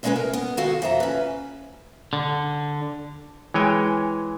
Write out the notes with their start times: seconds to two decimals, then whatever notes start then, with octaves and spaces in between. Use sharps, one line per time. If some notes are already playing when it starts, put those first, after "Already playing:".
0.03 D2 G3 G#3 C#4 A4 B4
0.16 A#4
0.33 B3
0.57 D#3 G#3 F#4 A4 F5
0.82 F2 E5 A#5
1.00 C#4 B4
2.13 D3
3.54 E3 G#3 C#5 G5 G#5